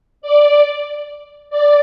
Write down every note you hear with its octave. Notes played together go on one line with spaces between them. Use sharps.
D5
D5